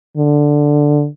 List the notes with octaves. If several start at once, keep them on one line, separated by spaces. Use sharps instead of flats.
D3